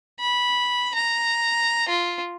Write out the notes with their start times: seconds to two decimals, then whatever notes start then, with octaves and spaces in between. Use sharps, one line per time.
0.20 B5
0.94 A#5
1.89 F4